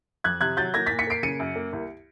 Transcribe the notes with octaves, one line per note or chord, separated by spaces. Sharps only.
F2 F#6 G#6
C3 F#6 G#6
F#3 G6 A6
A#3 G#6 A#6
A6 B6
A#2
B6 C#7
A#3 C7 D7
C#3 C#7 D#7
F#2
A#3
C2